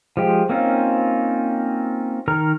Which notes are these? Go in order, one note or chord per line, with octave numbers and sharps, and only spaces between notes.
F3 G#3 G4
A#3 C4 C#4 D#4 F4
D#3 A#4 A#5 F6